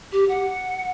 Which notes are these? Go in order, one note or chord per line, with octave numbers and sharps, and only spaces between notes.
G4
F#5